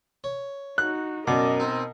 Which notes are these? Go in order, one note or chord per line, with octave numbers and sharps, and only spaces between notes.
C#5
D#4 F#4 F#6
F#2 B2 A#4 D5 D#5 D6
C4 D#4